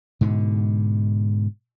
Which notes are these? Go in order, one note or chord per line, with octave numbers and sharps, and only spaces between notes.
G#2 B2 D3